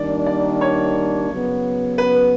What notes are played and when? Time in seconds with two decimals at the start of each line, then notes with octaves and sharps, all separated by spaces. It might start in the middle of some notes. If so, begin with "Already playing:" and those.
Already playing: D#3 G3 A#3 D4 D5
0.26 D5
0.61 C#5
1.30 C#3 F#3 B3
1.98 B4